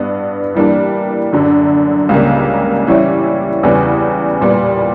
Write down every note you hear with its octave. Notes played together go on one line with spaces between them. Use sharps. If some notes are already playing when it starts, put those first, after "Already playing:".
Already playing: G2 B3 D4
E3 G3 A#3 D4
F#2 D3 F#3
C#2 C#3 G3 A#3
E3 G3 C#4 E4
E2 C#3 G3 B3
A#2 G3 B3